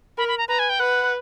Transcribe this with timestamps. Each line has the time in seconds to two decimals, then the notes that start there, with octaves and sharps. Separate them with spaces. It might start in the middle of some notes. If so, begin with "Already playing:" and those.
0.18 A#4 B5
0.28 B5
0.38 A#5
0.48 B4 A#5
0.59 G#5
0.70 G5
0.79 B4 F#5